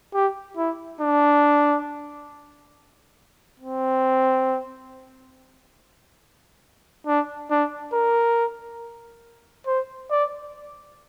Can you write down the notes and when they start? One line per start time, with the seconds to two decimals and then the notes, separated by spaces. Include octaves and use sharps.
0.14 G4
0.57 E4
1.01 D4
3.60 C4
7.07 D4
7.51 D4
7.93 A#4
9.67 C5
10.11 D5